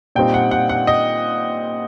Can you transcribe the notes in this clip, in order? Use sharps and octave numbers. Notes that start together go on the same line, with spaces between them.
A#2 G3 C4 D#4 G5
F#5
F#5
F#5
D#5